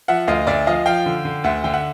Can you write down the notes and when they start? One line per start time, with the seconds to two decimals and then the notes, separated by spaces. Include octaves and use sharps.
0.08 F3 E5 F#5
0.28 D2 D#5 F5
0.47 D2 D5 E5
0.66 F3 D#5 F5
0.86 F3 F5 G5
1.06 D3
1.25 D3
1.44 D2 E5 F#5
1.64 D3 G5
1.74 E5 F#5